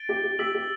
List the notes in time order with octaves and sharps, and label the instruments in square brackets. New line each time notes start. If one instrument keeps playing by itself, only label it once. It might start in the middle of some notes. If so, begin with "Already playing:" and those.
Already playing: [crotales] A6 D7 G7
[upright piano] G4
G4
[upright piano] G4 [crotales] E6 B6 F#7
[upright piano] G4